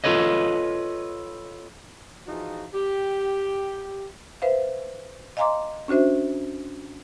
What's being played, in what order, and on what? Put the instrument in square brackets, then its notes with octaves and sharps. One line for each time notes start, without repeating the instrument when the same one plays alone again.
[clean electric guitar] F4 G4 A4 B4 C#5 D#5
[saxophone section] E3 F3 D#4 F4 F#4 G#4
G4
[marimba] B4 C5 E5 F5
D#5 F5 G#5 A#5 C6 D6
C#4 D4 F#4 C5 E5